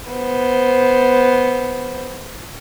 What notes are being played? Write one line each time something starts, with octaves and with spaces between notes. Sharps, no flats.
B3 C5